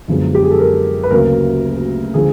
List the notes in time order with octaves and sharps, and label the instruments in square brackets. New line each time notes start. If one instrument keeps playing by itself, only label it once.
[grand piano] F#2 D3 F3 G#3 B3
G4
G#4
A4
A#4
B4
D2 C#3 F#3 A#3 A#4
D3 F3 G#3 G#4